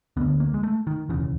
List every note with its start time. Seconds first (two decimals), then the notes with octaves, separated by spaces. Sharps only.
0.17 D2 D3 B3
0.40 A#3
0.54 G#3
0.63 A3
0.87 D#3
1.09 E1 D#2 C#3 E3